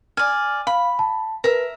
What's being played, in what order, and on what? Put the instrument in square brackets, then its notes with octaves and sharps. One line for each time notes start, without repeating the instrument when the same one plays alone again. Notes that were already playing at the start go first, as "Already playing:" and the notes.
[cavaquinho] D5 G#5 [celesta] F6
[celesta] F5 [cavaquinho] B5
[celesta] A5
[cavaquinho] A#4 E5 [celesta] B4